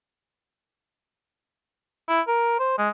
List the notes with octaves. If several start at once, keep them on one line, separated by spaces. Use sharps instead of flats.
E4
A#4
C5
G#3